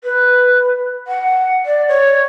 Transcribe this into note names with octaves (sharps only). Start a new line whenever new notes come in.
B4
F#5
D5
C#5